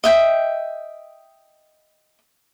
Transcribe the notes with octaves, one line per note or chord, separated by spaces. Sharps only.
D#5 E5 G5